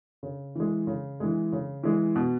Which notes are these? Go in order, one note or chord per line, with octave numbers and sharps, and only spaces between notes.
C#3
E3 G#3
C#3
E3 G#3
C#3
E3 G#3
B2